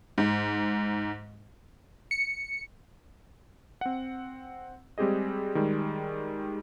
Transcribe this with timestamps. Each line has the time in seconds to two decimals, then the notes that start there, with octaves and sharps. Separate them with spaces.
0.18 G#2
2.11 C#7
3.81 C4 F#5
4.98 G3 G#3 C4 G4 G#4 D#5
5.55 D#3 G3 G#3